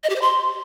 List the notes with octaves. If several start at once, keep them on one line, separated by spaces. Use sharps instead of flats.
D#5
G4
C5
C6